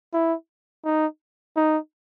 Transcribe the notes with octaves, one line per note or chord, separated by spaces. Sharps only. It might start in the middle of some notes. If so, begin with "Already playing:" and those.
E4
D#4
D#4